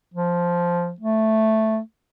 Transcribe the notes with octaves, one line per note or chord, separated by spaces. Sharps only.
F3
A3